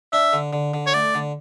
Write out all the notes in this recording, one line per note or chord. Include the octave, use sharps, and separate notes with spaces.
D4 E5
D3
D3
D3
C#5
A3 D5
D3